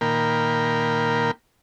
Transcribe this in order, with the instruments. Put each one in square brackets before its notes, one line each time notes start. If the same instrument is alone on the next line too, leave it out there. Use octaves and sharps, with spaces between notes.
[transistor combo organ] A#2 D#3 A#3 A#4 G5 B5